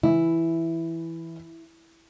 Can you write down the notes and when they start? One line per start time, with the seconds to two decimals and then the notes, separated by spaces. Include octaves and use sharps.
0.03 E3 E4